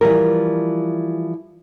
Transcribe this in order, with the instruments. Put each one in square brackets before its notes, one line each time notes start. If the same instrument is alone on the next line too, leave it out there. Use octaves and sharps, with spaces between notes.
[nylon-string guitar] E3 F3 G3 A#4